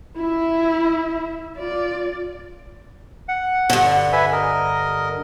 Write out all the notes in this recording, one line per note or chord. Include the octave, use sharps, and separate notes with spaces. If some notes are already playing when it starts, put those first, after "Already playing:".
E4 E5
F4 D5
F#5
G2 D3
B4 E5 G#5
A#4 D#5